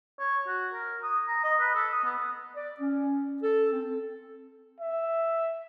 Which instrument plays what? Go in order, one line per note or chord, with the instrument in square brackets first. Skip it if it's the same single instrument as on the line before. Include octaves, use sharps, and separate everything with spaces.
[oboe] C#5
F#4
A#4
D#6
A#5
D#5
B4
A4
D#6
B3
[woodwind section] D5
C#4
A4
C4
[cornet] E5